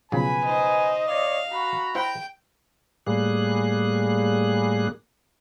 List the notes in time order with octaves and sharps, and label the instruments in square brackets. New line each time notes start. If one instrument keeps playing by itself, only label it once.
[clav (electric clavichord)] B1 C#3 F3 [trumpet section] B4 G#5 [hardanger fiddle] B5
[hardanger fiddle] D#4 C5 [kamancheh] D#5
[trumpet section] C#5 D5 [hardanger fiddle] F5
[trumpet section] F#4 [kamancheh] A#5 B5
[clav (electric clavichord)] E4 C5 F#5 [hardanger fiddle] G5
[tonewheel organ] A2 G3 A#3 G#4 F#6